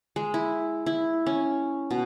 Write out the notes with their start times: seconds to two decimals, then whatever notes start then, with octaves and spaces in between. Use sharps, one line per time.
0.16 G#3
0.34 E4
0.86 E4
1.26 C#4
1.91 B2